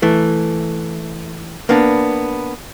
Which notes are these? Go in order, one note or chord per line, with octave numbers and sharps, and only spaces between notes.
E3 A3
A#3 B3 D4